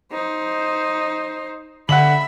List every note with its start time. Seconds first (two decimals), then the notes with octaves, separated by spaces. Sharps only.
0.12 D#4 C5
1.89 D3 E5 F#5 B5 F#7